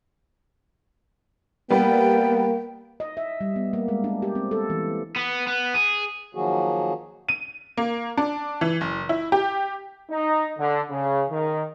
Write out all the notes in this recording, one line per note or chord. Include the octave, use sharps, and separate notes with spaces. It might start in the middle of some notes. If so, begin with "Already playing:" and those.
G3 A#3 B3 G5
D#5
E5
G3
B3
A#3
G#3
D4
G4
C4
A4
E3
B3
B3
G#4
D#3 F3 F#3 A#3 F#4 G#4
D#7
A#3
D4
E3
F#1
E4
G4
D#4
D3
C#3
D#3